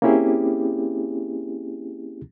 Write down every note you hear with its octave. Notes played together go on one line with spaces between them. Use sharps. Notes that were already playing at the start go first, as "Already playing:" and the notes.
A#3 C4 C#4 E4 G4 G#4